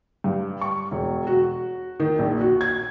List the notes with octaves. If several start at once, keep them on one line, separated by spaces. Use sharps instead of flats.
G2
C#6
E1
F#4
D#3
A#1
F#4
G#6